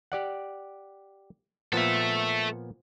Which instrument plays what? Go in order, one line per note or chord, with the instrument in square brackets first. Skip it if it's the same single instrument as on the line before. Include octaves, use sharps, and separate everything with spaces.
[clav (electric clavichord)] G4 D5 F#5
[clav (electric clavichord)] A#2 F3 B3 [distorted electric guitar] A4 E5